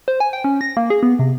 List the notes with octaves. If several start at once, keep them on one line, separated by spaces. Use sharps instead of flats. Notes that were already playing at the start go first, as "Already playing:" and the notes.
C5
G#5
G5
C#4
A#6
A#3
G#4
B3
C3